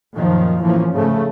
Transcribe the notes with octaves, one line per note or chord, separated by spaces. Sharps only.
F#2 A#2 D#3 F3
A2 E3 F3 A#3 C#4
G#2 C#3 A3